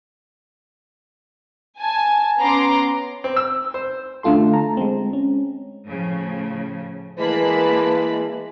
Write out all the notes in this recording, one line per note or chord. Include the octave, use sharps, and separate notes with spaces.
G#5 A5
B3 C#4 A#5 C6 D6
C4
E6
C5
D3 A3 F4 A4 C6
A5 A#5
G#3 C4
C#4
A2 C#3 F3
E3 G#3 A#3 B4 A5 B5